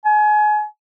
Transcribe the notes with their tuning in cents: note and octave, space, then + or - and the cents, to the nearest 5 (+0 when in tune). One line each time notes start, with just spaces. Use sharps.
G#5 +30